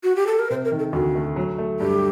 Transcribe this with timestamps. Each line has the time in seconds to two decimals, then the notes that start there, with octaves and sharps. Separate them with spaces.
0.04 F#4
0.16 G4
0.27 A4
0.39 A#4
0.50 C3 C5
0.65 A#4
0.72 D#3
0.79 A4
0.93 D2 F#4
1.15 A3
1.36 F#3
1.58 A3
1.80 G2 G4